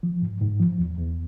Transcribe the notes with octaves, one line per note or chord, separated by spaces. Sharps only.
F3
G#2
G#2
F3
E2
E2